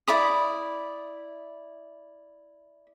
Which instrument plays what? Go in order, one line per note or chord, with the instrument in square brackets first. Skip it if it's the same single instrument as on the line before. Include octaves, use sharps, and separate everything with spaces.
[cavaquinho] E4 D5 B5 D#6